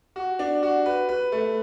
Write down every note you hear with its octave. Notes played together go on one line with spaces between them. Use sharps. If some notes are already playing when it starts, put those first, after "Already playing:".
F#4
D4
F#4
B4
B4
A3